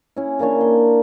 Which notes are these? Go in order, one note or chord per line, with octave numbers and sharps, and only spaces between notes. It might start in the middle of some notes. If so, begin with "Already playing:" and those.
C#4 E4
C#3 A#3 D4 C#5
C6